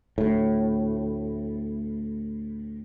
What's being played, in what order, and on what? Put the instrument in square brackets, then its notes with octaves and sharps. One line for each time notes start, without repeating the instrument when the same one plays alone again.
[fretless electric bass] D2 A2